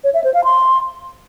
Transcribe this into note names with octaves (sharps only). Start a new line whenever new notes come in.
C#5
E5
C5
F5
C6